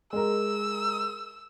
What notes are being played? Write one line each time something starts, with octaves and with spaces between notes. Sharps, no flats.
G#3 A#4 E6